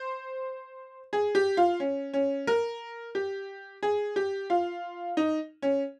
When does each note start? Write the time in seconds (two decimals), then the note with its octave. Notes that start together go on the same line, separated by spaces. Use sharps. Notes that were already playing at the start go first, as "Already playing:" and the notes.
Already playing: C5
1.13 G#4
1.35 G4
1.57 F4
1.80 C#4
2.13 C#4
2.47 A#4
3.15 G4
3.83 G#4
4.16 G4
4.50 F4
5.17 D#4
5.62 C#4